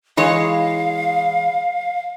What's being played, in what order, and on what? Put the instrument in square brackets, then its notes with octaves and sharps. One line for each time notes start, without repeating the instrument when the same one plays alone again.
[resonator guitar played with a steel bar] E3 G#3 C#5 [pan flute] F5